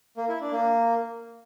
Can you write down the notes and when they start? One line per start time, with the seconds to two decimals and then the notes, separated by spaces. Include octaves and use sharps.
0.17 A#3
0.29 E4
0.40 D4
0.52 A#3